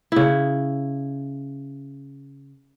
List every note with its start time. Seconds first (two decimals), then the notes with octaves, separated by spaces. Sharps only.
0.12 C#3 E4